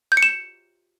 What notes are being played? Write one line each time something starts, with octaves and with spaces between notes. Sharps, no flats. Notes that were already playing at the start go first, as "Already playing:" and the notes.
G6
C#7
E7